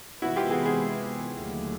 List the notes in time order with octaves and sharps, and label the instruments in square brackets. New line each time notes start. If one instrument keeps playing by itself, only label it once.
[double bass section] C3 E3 G#3 B3 [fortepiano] E4 F#4
[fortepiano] F4 G4
F#4 G#4
F#4 G#4
[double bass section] D#2 D3 F#3 A3